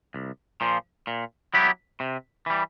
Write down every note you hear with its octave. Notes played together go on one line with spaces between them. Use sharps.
C2
A#2 F3
A#2
F#3 B3 E4 G4
C3
E3 G3